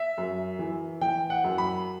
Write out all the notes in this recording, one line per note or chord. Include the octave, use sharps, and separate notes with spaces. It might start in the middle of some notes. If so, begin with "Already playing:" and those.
Already playing: E5
F#2
E3
E3 G5
F#5
F#2
B5